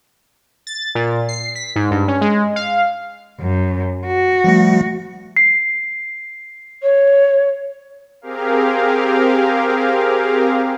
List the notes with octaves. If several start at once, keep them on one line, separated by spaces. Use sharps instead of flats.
A6
A#2
C7
B6
G#2
G2
C#4
G#3
F5
F#2
F#4
F3 G3 A3
C7
C#5
C4 G4 G#4 A#4 F5